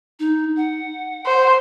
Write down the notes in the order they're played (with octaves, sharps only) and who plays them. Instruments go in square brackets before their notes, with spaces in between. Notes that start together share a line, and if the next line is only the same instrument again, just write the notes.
[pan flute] D#4
F#5
[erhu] C5